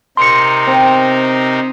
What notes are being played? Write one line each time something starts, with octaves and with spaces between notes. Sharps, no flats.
C3 D#4 A#4 C6 C#7
C4